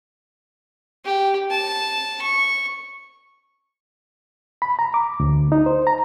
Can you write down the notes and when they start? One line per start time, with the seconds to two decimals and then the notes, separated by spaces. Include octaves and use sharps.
1.05 G4
1.51 A5
2.21 C#6
4.62 B5
4.79 A#5
4.94 D6
5.20 D2
5.52 D#4
5.66 C5
5.87 A#5